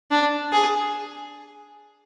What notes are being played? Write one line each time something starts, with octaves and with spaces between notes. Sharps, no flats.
D4
G#4